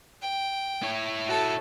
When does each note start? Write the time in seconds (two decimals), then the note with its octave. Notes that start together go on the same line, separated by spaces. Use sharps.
0.22 G5
0.83 E4 C#5
1.26 F#4 A4